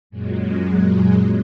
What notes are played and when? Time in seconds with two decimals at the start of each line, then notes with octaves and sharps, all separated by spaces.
0.10 F#2 A#2 F#3 G#3